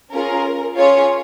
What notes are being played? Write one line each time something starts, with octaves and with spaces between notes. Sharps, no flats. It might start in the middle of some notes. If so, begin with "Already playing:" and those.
C#4 F4 G#4 A#4
C#4 F4 G#4 C#5